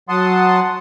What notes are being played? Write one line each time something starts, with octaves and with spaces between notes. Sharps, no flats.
F#3 F#5 A5 C6 D#6